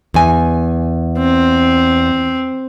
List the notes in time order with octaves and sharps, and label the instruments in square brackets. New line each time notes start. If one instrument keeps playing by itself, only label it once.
[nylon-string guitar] E2 G#5
[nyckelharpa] C4